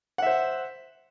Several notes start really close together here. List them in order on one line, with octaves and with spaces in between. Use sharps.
F#5 E5 C5